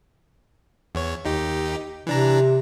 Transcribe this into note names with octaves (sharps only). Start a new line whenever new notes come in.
E2 C#5
D#2 D#4 G4
C3 E3 D4 A#5